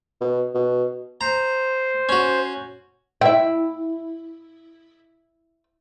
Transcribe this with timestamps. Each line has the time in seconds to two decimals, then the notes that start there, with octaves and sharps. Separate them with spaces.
0.21 B2
0.55 B2
1.21 C5 A#5
2.09 C#4 F#4
3.21 E4 E5 G5